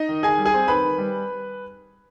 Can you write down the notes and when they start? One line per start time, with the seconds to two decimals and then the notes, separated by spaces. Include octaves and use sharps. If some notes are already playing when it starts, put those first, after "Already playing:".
Already playing: D#4 D#5
0.09 D#3
0.23 D#3 G#4 G#5
0.38 G3
0.46 G#4 G#5
0.54 C4
0.68 D#3 B4 B5
0.84 D#3
0.98 G3